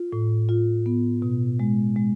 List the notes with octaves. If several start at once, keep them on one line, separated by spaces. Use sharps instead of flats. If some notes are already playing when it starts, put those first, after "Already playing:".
Already playing: F4
A2
F4
B3
B2
G#3
G#3